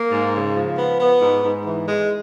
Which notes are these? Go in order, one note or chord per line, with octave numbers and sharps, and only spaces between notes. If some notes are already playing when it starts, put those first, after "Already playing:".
Already playing: A#3
G#2
C#3
F3
B3
B3
G#2
G#2
E3
G#3